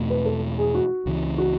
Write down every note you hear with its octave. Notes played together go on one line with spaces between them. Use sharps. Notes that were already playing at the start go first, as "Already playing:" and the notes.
Already playing: E2 B2 A3
B4
A4
G#4
F#4
C#2 C#3 E3
F#4